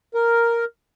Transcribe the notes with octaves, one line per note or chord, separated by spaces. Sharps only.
A#4